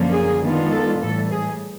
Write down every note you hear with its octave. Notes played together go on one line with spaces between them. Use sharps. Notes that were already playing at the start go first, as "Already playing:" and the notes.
Already playing: F#2 D3 F3 A#3 C#4
G#4
D#3 G#3 B3 D4 F4
A4
A2 E3 G3 A4
G#4